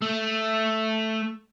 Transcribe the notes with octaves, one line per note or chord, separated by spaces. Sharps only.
A3